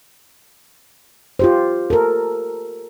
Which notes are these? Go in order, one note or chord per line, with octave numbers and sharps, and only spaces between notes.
F4 G4 C5
A4 A#4